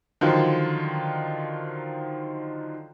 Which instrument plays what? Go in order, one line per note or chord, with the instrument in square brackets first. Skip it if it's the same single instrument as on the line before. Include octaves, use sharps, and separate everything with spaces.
[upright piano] D3 D#3 F3 F#3 F4